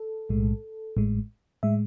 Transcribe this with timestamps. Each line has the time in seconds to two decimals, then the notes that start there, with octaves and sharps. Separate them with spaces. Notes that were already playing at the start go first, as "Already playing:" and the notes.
Already playing: A4
0.29 B1 A2 G#3
0.97 A1 A2 G#3
1.63 A2 G#3 E5